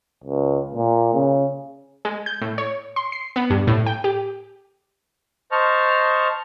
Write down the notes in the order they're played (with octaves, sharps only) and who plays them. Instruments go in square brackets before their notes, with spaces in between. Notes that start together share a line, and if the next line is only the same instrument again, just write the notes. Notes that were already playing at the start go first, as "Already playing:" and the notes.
[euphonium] C#2
A#2
C#3
[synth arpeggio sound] G#3
G6
A2
C#5
C6
C7
B3
G2
A2
G5
G4
[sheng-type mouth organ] C5 D#5 A5 C#6 F6